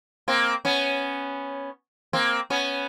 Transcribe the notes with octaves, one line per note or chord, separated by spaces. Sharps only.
A#3 C4
B3 C#4
A#3 C4
B3 C#4